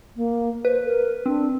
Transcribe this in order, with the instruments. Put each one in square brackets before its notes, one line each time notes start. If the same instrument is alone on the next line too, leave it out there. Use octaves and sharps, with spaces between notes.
[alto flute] A#3
[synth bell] B4 [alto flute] C5
[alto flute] A#4
[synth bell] C4 [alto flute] D4